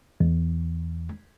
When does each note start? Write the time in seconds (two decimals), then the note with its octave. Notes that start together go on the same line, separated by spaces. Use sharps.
0.20 E2